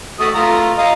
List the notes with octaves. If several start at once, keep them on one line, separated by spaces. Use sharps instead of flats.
A3 F#4 D#6
A3 F4 A#5
D#5 F5 A#5